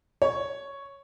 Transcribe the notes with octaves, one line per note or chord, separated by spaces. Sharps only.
C#5